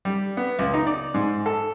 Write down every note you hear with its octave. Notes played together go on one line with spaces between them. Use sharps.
G3
B3
C#2
D#4
D5
G#2
A4